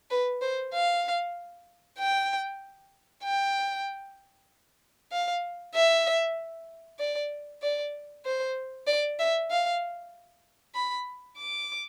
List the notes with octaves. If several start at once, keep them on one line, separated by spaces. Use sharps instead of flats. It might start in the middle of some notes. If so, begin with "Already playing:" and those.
B4
C5
F5
G5
G5
F5
E5
D5
D5
C5
D5
E5
F5
B5
D6